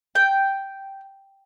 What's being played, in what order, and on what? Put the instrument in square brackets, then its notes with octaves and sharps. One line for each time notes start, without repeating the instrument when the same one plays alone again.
[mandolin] G5